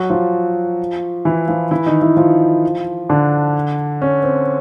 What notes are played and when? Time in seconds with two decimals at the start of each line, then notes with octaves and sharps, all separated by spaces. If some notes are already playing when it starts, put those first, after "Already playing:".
Already playing: F#3 F#4
0.10 F3 F4
1.25 E3 E4
1.48 F3 F4
1.71 E3 E4
1.86 D#3 D#4
2.02 E3 E4
2.17 F3 F4
3.09 D3 D4
4.02 C#4
4.23 C4